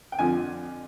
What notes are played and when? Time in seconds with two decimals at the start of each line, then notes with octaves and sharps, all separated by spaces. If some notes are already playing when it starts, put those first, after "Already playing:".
0.12 G5
0.19 F2 D3 F3 G#5